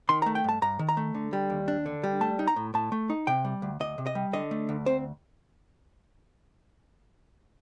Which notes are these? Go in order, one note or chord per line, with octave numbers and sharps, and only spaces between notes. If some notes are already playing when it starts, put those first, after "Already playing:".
D#3 C6
A3 A#5
G5
G2 A5
G2 A#5
D#3
A#5
A3
D3
G3
D#2
D4
D3
G3
A3 A5
D#4
A#5
A2
A2 A5
A3
D#4
C3 G5
G3
D2
D2 D#5
C3
D#5
G3
D3 D#5
A3
D2
C4 C5